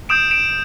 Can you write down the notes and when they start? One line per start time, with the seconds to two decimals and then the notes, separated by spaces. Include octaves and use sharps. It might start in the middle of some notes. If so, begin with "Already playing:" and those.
0.09 D#6 G6 D7 E7
0.31 D7 E7